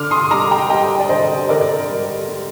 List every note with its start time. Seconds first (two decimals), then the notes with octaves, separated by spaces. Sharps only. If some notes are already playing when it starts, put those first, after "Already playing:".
Already playing: D3 D6 F6
0.11 C6 D#6
0.30 G3 A#5 D6
0.51 G5 A#5
0.70 G3 D#5 G5
1.00 D5
1.09 D3 C5 D#5
1.49 D3 A#4 D5
1.89 G3
2.28 G3